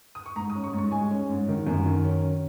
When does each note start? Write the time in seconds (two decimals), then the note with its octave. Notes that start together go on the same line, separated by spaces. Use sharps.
0.15 D#6
0.26 C#6
0.36 G#2 A#5
0.50 D#6
0.55 C#4
0.64 C#6
0.73 G#2
0.78 C#6
0.92 G#3 G#5
1.11 C#4
1.29 G#2
1.48 D#3
1.67 F#2
1.86 D#3
2.04 C#4
2.22 C#4